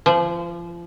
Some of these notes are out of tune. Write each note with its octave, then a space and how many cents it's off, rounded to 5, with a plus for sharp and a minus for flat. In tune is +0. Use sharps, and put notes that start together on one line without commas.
F3 -30